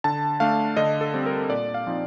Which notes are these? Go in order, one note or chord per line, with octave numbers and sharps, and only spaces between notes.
D3 A5
A3 D4 F5
D3 D#5
A4
G3 C4
A#4
A#2 D5
F5
F3 C4 D#4